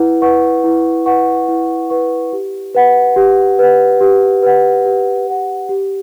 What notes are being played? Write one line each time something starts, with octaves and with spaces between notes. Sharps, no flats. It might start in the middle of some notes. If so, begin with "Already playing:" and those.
Already playing: E4 B4 F#5
B4 F#5 C#6
E4
B4 F#5 C#6
E4
B4 F#5 C#6
G4
B4 F#5
G4
B4 F#5
G4
B4 F#5
G4
B4 F#5
G4